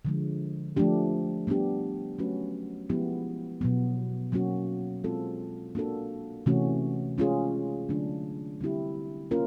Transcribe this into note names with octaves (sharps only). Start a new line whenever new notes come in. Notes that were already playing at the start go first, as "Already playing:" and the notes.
D3 F3 G#3
F3 A3 D4 G4
G3 B3 D4 G4
F#3 A3 C#4 F#4 B4
F3 G#3 B3 E4 G4
B2 F#3 B3
F#3 A#3 C#4 F#4
G#3 C4 F4 A4
A#3 D4 F#4 A4
C3 E3 A3 C#4 F#4
G#3 C#4 F4 G#4
D3 F#3 A3 D4
D3 G3 C4 E4 G4
A#3 C#4 F4 A#4